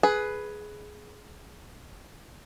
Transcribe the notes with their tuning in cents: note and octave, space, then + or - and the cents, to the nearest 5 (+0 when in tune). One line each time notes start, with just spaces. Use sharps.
G#4 +15 B4 +0